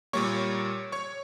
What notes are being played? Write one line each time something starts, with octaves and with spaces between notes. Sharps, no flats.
A#2 G3 A#3 C#5 C#6
C#5 C#6